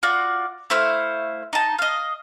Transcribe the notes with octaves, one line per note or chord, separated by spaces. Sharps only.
F4 F#4 D5
A3 E4 C5 F5
D#4 A5
D#5 F5